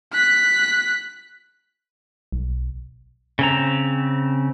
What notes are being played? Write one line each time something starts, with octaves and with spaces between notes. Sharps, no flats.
F#6 B6
B1
C#3 C4 A#5